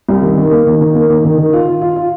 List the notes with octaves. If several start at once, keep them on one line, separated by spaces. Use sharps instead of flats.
C2
D#3
D#3
A#3
D#3
D#3
A#3
D#3
D#3
D#3
F4
F4
F4
F4